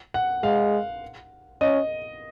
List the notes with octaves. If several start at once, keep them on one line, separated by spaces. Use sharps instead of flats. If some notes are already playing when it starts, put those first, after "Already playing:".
F#5
G#3 F5
C#4 D#5